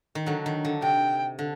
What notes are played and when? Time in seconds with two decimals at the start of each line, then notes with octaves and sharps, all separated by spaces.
0.15 D#3
0.26 D3 F#3
0.46 D#3
0.65 D3
0.82 C3 G5
1.39 D3